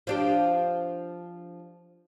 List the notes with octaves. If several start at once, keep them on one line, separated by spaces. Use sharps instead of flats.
F3 D4 G4